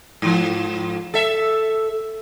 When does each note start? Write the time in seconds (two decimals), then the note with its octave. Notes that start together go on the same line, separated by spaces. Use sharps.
0.22 G#2 F3
1.14 A4 E5